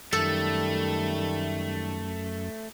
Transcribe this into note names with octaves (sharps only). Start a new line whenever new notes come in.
F#2 D#3 G3 A3 A4